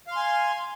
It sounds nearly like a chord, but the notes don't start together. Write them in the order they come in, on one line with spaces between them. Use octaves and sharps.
F5 C6 G#5